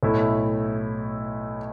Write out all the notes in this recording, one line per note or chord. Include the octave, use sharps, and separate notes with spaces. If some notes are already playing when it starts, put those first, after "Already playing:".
B1 A2 A3 E4